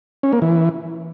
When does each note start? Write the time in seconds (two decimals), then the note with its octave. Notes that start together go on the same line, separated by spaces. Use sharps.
0.23 C#4
0.33 A#3
0.42 E3